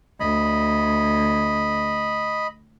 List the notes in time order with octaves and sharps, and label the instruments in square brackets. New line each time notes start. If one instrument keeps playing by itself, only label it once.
[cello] D2 [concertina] D#5 B5